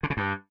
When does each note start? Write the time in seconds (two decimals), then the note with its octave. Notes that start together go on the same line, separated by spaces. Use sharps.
0.03 D3
0.10 C#3
0.17 G2